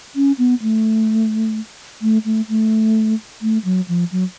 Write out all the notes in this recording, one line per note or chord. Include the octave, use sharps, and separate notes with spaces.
C#4
B3
A3
A3
A3
A3
A3
F#3
F3
F#3